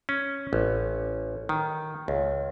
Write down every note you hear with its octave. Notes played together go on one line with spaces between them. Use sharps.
C#4
A1
D#3
C#2